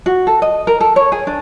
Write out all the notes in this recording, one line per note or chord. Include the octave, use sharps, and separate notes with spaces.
F#4
A4
D#5
A#4
A4
C#5
G#4
D4